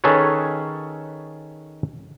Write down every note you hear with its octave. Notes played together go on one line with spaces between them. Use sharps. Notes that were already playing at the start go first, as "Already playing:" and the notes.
D#3 C#4 G#4 A4 B4 C#5